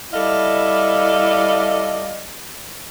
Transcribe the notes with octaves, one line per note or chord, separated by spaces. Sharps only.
G3 E4 A4 D5 D#5 F5